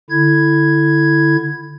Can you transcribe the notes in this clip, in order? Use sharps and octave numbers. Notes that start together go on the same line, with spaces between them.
D3 E4 G#6